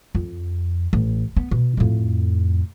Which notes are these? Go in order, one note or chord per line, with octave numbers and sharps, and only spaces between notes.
F2
A1
B3
B2
F2 A2